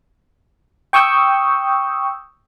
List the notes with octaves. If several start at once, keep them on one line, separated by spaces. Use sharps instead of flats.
G5 C#6 D#6 E6 G6